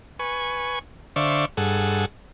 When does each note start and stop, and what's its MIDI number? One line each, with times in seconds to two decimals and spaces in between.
0.19 0.79 71
0.19 0.79 80
0.19 0.79 85
1.16 1.45 50
1.16 1.45 72
1.16 1.45 74
1.16 1.45 76
1.16 1.45 77
1.16 1.45 85
1.57 2.05 43
1.57 2.05 68
1.57 2.05 69
1.57 2.05 78